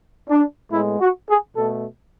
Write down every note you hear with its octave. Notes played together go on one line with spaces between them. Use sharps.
D4
A2 G#3 B3 E4
F#4
G#4
B2 A3 A4